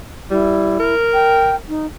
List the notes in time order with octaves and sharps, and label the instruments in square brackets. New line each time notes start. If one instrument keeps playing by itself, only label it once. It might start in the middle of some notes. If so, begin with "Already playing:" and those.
[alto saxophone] G3 [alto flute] E4
[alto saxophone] A#4
[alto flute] G5
D#4